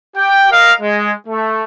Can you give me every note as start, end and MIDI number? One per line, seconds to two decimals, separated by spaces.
0.15 0.49 67
0.15 0.49 79
0.51 0.72 70
0.51 0.72 75
0.51 0.72 77
0.81 1.11 56
1.27 1.64 57